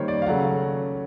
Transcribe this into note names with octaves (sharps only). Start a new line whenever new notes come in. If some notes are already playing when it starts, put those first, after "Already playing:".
Already playing: D#3 G3 A#3 C5 C#5
D5
F5
C#3 F#3 A3 F#5